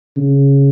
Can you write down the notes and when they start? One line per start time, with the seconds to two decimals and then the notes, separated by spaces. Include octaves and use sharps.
0.17 C#3